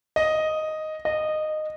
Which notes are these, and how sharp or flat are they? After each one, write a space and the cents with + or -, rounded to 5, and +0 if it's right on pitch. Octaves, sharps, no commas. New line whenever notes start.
D#5 +0
D#5 -15